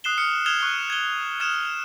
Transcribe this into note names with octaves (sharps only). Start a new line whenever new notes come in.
D#6 F#6 C7 E7 G7
D#6 F6 C#7
D#6 F6 G#6 E7 F7 G7
C#6 F#6 G7
G#6 G7
D#6 F6 G#6 E7